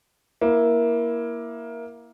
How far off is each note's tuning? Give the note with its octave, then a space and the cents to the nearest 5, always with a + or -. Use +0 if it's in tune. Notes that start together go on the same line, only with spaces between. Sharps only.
A#3 +15 E4 +0